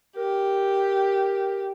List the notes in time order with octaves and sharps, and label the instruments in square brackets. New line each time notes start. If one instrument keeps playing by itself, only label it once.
[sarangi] G4 [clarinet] A#4